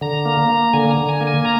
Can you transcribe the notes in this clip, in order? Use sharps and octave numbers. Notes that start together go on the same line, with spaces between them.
D3 A#5
A#3
A#3
D3 G#5
A#5
D3
G#5
A#3
G#5
A#5